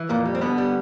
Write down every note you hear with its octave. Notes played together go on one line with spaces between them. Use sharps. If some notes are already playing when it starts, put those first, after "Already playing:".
Already playing: E3
F2 A#2 A#3
G3
C4
B2 D3 B3
G3